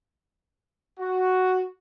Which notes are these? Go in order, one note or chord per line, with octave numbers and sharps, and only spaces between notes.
F#4